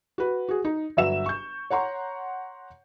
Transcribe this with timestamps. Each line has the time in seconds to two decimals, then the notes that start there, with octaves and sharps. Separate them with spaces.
0.18 F#4 B4
0.49 F#4 G#4
0.65 D#4
0.97 G1 F#3 E5 E6 E7
1.26 C#6 G6
1.70 C#5 F#5 A#5 C6 C#6